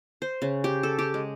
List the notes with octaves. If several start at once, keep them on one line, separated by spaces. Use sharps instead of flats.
C5
C#3
G4
A4
G4
G#3